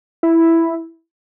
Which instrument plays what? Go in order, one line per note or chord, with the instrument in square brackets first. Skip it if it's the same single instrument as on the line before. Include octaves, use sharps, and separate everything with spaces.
[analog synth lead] E4